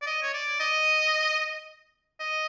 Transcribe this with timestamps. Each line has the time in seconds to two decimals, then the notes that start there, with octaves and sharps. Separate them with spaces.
0.02 D5
0.07 D#5
0.22 C#5
0.33 D5
0.60 D#5
2.20 D#5